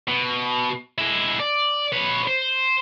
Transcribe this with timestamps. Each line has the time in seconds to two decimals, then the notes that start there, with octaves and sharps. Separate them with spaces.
0.08 B2
0.98 G#3 E4
1.40 D5
1.93 B4 C#5
2.28 C5